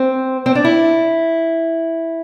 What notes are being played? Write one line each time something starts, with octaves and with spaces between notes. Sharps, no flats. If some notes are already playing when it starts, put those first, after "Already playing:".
Already playing: C4
C4
D4
E4